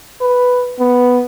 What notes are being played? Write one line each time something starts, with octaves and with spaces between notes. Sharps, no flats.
B4
B3